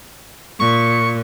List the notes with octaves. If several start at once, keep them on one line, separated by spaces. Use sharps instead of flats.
A#2 C#6